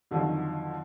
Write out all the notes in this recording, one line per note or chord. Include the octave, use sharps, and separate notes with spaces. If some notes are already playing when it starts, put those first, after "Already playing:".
F2 D3 D#3 F3 F#3